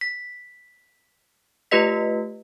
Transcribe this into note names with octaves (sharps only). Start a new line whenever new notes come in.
B6
A3 F4 G4 B4 D#5 B6